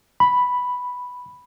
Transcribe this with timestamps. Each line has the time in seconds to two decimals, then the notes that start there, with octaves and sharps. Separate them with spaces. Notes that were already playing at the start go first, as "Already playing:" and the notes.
0.20 B5